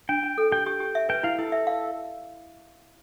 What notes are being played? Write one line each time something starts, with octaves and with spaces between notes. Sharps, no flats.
D4 G5
D4
A4
G4 G5
G4 G5
G4
E5
B4 G5
E4 F5
E4 A4
E5
F5